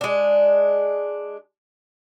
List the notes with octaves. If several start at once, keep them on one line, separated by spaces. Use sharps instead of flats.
G#3 D4